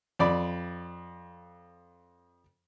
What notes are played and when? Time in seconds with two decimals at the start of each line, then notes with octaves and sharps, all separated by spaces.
0.19 F2 D5 B5